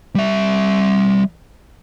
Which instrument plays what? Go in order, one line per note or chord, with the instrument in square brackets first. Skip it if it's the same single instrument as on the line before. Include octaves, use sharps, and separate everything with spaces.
[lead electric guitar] G3 E5